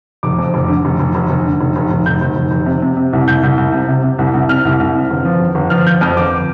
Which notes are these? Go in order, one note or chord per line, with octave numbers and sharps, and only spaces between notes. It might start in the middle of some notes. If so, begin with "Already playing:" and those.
F1 D6
F2
F1
D3
F1
F1
F1
F1
D3
F1
F1
F1
F1 G6
F1
F1
F1
C3
C3
C3
C2
C2 G6
C2
C2
C3
C3
C3
C2
C2
C3 F6
C2
C2
C3
G1
F3
G1
G1
F3 F6
F3 G6
F2 F6
G1 D6